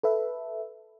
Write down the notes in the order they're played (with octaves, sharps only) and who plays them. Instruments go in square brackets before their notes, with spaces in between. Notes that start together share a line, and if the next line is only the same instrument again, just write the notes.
[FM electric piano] A4 B4 E5